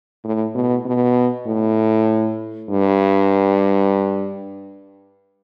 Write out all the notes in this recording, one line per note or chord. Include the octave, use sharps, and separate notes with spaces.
A2
B2
B2
A2
G2